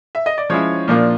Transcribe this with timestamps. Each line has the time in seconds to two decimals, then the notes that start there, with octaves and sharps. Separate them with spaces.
0.15 E5
0.26 D#5
0.38 D5
0.50 F3 G#3 C#4 E4 C#5
0.88 A#2 F3 A#3 D4